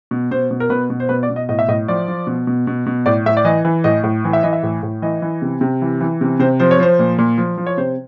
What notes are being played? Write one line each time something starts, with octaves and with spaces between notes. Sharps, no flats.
B2
B2 C5
B2
A#4
B2 B4
B2
C5
B2 B4
D5
B2
D#5
A2 D#5
E5
A2 D#5
F3 D5
F3
B2
B2
B2
B2
A2 D5
A2 E5
D5
E3 D#5
E3
A2 D#5
A2
E3
E5
E3 D#5
E5
A2
A2
E3 D#5
E3
C3
C3
E3
E3
C3
C3 C5
F3 C5
C#5
F3 C5
A#2
A#2
F3
F3
C#5
C3 C5